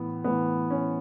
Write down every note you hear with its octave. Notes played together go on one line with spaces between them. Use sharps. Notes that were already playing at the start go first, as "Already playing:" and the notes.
Already playing: A2 E3 B3
A2 E3 B3
C#4